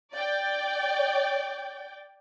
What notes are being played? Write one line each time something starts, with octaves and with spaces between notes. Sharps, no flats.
D5 G5